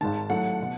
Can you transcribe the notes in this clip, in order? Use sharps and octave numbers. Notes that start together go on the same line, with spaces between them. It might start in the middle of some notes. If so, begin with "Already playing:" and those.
G#1 G#2 D#3 A5
A2 F#3 A3 F#5
B2